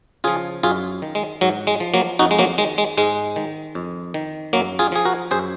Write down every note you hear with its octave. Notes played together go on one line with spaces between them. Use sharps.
C#3 F3 F4 G#4
F#2 F4 G#4
D#3
G#3
G#2 F#3
G#3
F3
F#3 A#3
F2 D#4 F#4
G#3
F#3 A#3
D#3 G#3
G#3
G#2 G#3
D#3
F2
D#3
F#2 F#3 A#3
F4 G#4
F3 G#4
F#4 A#4
F#2 G#4 C5